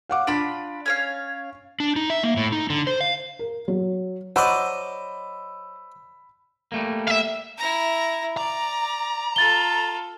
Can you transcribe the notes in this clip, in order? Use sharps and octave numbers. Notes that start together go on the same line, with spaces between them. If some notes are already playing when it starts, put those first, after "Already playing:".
F5 F#5 D6
D4 F4 B5 A6 D7
C#4 C#5 F5
D4
D#4
E5
A#3
A2
D#4
D3
C5
F5
A#4
F#3
F#3 C5 D5 D#5 B5 E6
G3 A3 A#3
E5 F5
E4 A#5
D5 A#5
F4 A4 A6 G7